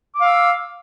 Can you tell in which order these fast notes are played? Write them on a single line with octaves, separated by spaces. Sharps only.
D6 F5 E6